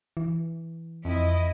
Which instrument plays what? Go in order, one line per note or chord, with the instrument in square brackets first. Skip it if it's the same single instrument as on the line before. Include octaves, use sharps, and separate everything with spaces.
[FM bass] E3
[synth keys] F2 [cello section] E4 D#5